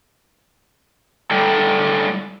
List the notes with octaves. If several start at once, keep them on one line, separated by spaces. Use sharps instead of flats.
A2 D3 G3 A4 G5